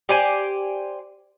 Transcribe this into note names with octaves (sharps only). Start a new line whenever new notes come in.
G4 C5 D5 G#5